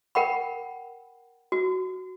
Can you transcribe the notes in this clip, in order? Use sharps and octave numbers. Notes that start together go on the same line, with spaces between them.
A#4 F#5 G5 B5
F#4